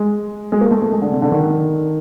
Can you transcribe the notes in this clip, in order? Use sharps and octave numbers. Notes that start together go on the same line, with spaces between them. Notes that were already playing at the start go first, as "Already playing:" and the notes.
Already playing: G#3
G#3
A#3
A3
A3
G#3
D3
C3
D3
D#3